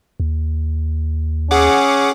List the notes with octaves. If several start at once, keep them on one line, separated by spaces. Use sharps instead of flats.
D#2
C#4 G#4 F#5 D6